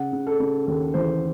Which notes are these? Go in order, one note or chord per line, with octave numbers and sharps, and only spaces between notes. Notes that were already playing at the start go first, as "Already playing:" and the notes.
Already playing: C#3 F#5
C#3
A4
C#3
D#2 A4
E3 C5